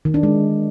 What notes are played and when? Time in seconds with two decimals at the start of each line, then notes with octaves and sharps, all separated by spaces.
0.05 D#3
0.14 D4
0.23 G#3